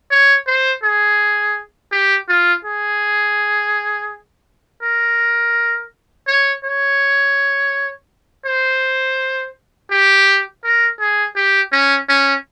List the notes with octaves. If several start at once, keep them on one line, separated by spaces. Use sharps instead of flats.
C#5
C5
G#4
G4
F4
G#4
A#4
C#5
C#5
C5
G4
A#4
G#4
G4
C#4
C#4